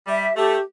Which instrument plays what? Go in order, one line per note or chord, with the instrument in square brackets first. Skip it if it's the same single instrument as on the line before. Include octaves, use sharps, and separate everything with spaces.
[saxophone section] G3 [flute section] E5
[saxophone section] A3 [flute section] G4